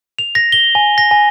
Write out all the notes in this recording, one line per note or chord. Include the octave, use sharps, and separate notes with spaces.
F7
A#6
G7
G#5
A#6
G#5